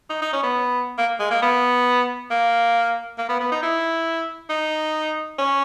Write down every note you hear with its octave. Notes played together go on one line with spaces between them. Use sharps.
D#4
D#4
C#4
B3
A#3
G#3
A#3
B3
A#3
A#3
B3
B3
D#4
E4
D#4
C#4